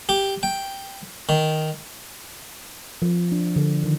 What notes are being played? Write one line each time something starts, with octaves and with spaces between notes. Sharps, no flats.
G4
G5
D#3
F3
D4
D3
D#3